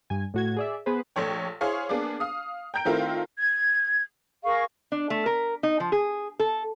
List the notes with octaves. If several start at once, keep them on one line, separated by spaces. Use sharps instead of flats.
G2 G#5
A2 F#4 G#6
G#4 D5 E5
B3 G#4 B4 C5
A#1 A3 C#5 G5
E4 G#4 C5 C#5 F5
A#3 B3 D4 G#4 D6
F5 D#6
G5 A#5 G6 D7
D#3 A3 C4 E4 F4 A#4
G#6
G#4 A#4 F5 C#6
D4
A3
A#4
D#4
F3
G#4
A4